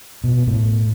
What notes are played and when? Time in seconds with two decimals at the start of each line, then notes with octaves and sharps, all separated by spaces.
0.24 B2
0.47 A2